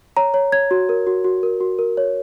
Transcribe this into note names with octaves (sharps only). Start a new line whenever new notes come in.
C#5 A#5
C#5
C#5 G#6
F#4
A#4
F#4
F#4
A#4
F#4
A#4
C#5